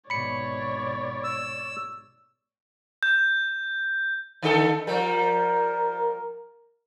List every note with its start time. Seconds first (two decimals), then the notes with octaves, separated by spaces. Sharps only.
0.10 G#1 B2 C#5 D5 B5 C#7
1.24 E6
3.03 G6
4.42 D3 D#3 A4
4.87 F3 G3 A#4